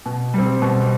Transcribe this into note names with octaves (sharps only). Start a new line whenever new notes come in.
B2
G3 C4
B2